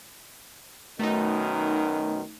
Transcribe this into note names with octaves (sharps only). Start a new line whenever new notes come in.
F#2 B2 D#3 A3 D#4